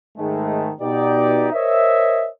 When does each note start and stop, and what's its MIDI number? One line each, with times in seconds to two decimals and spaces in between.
0.18 0.71 44
0.18 0.71 51
0.18 0.71 56
0.18 0.71 57
0.81 1.47 47
0.81 1.47 63
0.81 1.47 67
0.81 1.47 74
1.53 2.28 70
1.53 2.28 72
1.53 2.28 73
1.53 2.28 75
1.53 2.28 76